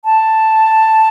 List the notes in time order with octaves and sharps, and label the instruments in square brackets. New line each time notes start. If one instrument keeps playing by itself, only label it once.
[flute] A5